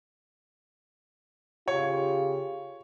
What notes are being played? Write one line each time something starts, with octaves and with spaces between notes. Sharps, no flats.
C#3 F4 G4 C#5